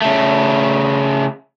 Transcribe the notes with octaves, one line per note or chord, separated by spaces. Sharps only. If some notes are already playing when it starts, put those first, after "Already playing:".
C#3 A3